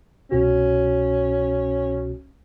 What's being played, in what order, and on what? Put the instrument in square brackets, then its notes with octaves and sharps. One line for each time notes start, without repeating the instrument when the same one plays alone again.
[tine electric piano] C2 B2 F#4 [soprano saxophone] C#4